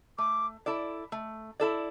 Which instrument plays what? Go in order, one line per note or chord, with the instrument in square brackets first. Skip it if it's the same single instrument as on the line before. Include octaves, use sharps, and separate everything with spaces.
[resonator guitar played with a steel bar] A3 [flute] D6
[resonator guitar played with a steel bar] E4 A4 D5
A3
E4 A4 D5